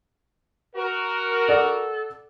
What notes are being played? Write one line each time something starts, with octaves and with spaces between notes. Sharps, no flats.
F#4 A#4
A4 D5 F#5 D6